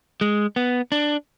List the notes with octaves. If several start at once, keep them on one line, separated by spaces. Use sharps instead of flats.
G#3
B3
D4